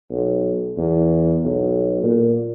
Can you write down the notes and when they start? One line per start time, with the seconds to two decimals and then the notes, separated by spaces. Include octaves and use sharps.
0.11 B1
0.78 E2
1.44 B1
2.03 A#2